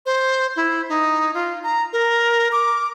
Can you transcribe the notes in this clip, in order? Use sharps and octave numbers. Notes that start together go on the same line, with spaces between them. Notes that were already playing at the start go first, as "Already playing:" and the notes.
C5
E4
D#4
F4
A#5
A#4
D6